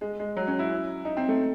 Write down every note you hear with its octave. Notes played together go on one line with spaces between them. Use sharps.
G#3
G#3
F#3
C#4
E4
D#4
C4
A3